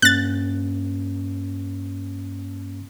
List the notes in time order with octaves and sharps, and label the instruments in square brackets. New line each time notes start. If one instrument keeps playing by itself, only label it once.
[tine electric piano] G2 A#3 C#4 [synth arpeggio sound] F#6 A6